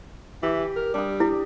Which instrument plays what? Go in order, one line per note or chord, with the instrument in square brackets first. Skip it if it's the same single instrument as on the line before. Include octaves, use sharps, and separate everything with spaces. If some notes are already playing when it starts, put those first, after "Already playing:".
[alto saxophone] E3 [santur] G4
[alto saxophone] A#4
[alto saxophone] G3 [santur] D4 D#6
[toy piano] E4 [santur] G4